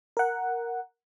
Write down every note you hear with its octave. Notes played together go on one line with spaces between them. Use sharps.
A#4 F#5